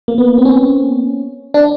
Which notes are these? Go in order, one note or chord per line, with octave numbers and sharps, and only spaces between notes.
A#3
B3
C4
C#4
D4